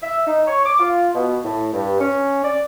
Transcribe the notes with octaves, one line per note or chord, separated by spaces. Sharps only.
E5
D#4
C#5
D6
F4
B2
A2
G2
C#4
D5